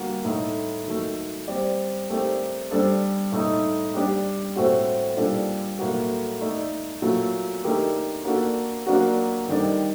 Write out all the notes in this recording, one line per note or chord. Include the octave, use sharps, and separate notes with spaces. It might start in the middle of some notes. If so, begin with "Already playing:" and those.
Already playing: D3 G3 A#3 F#4
A2 A3 D#4 A4
D#3 F#3 A3
G3 C4 G4 D5
A3 C4 G4 A#4 D5
G3 D4 A4 C5
A2 A3 D#4
G3 D4 G4
A2 A3 C4 F#4 C5
A#2 G3 D4 A4 D5
A2 F#3 A#3 F#4
A3 D#4 A4 D5
A#2 F#3 A3
D#3 A3 D4 G4 A#4
A#3 D4 F#4 A4
F#3 A#3 D4 F#4
D#3 G3 D4 A4 D5